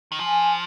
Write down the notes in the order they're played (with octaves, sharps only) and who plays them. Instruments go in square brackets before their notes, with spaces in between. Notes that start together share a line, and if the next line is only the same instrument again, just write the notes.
[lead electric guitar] D#3
[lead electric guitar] F3 [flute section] G#5